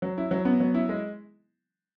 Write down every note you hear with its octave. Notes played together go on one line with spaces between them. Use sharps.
F#3
E4
F#3
B3
F#3
E4
G#3